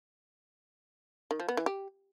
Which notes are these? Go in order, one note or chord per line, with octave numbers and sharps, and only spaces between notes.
D#3
F3
B3
E3
G4